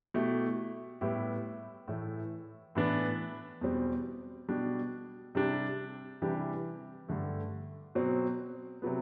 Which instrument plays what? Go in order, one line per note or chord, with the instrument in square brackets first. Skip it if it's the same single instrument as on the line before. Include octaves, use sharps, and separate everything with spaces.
[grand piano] B2 A3 E4 G4
A2 G3 B3 E4 G4
A2 E3 A3 E4
A2 E3 B3 D4
E2 B2 G3 C4
B2 G3 D4 G4
C3 G3 D4 G4
C3 E3 G3 D4 G4
G2 D3 A3
B2 F#3 C4
C3 F#3 B3